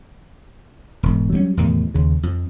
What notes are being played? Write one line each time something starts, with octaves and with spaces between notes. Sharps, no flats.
E1 G#2
F#3 G3 B3 C#4
E2 A2 C3 D#3
D#2 C#3
F2